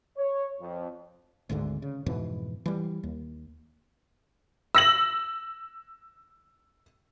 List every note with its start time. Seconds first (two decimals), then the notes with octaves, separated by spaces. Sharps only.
0.16 C#5
0.60 F2
1.50 G#1 D2 G#2 D3
1.82 C#3
2.06 F2 G#2 B2 E3
2.66 E3 G3
3.03 D#2
4.75 E6 A#6 F#7